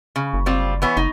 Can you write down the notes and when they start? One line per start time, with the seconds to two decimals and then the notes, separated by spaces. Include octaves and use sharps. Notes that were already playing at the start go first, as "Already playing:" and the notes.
0.16 C#3
0.33 F#1
0.46 G3 C4 F4
0.82 E3 B3 C#5
0.97 F#1 D#4